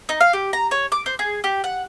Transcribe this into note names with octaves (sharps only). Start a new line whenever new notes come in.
D#4
F5
G4
A#5
C#5
D6
C5
G#4
G4
F#5